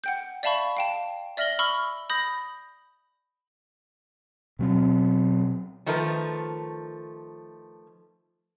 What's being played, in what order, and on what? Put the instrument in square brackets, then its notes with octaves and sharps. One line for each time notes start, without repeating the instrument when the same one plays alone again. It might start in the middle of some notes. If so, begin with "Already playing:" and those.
[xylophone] F#5 G5 G6
D5 E5 F5 A5 B5 C#6
F5 G5 A5
D5 E5 F6 A#6 F#7 G7
B5 C#6 E6 F6 G7
B5 D#6 G6 A#6
[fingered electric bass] B2 F#3 C4
[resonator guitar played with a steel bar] D#3 F3 A3 A#4 B4